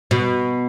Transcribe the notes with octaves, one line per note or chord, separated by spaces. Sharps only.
B2